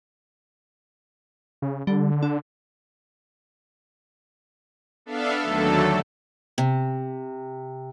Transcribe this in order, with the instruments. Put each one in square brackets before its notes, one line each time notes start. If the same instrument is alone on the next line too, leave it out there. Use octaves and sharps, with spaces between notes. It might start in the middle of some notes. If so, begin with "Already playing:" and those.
[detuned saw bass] C#3
[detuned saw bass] D3 [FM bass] G3
[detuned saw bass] D3 [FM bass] D4
[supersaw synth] B3 D4 A4 E5 F5
D#2 D3 F#3 A3 A4
[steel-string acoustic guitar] C3